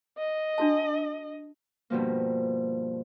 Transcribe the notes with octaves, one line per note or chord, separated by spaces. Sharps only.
D#5
D4 F#4 A5
G2 B2 F3 A#3